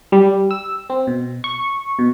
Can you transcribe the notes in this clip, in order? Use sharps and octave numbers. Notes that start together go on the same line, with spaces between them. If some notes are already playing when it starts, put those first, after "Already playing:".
G3
E6
C4
B2
C#6
B2